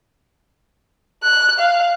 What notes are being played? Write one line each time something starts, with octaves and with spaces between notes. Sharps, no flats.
F#6
F5